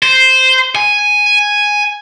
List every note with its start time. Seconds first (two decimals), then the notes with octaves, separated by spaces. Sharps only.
0.03 C5
0.75 G#5